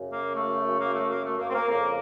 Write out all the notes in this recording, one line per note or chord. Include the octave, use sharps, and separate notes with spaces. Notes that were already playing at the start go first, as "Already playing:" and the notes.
Already playing: F#2 C#3
A#3
A3
A#3
A3
A#3
A3
A#3
C4
A#3
F2 C#3 A#3